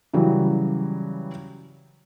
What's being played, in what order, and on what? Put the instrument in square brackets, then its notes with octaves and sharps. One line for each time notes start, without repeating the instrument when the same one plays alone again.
[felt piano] C#3 E3 F#3 G3